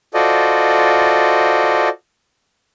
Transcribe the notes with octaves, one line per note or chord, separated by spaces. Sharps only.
F4 F#4 A4 C5 D5 D#5